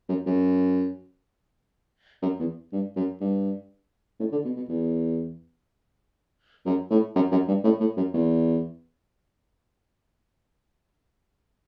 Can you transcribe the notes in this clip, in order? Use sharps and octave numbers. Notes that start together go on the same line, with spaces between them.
F#2
F#2
F#2
E2
G2
F#2
G2
A2
D3
B2
B2
E2
F#2
A2
F#2
F#2
G2
A2
A2
F#2
E2